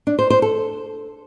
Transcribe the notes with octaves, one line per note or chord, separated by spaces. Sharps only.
D4
C5
C5
A4